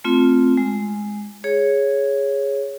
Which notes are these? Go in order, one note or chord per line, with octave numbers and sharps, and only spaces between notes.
A3 C4 F4
G#3
G#4 C#5